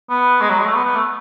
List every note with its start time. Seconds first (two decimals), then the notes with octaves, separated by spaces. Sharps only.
0.10 B3
0.41 G#3
0.49 F#3
0.58 G#3
0.65 A3
0.74 B3
0.85 B3
0.96 A3